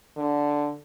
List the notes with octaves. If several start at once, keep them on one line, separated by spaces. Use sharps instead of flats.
D3